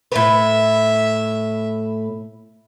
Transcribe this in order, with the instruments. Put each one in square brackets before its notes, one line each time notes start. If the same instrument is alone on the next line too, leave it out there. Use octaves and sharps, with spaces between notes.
[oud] A2 B4 [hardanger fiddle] E5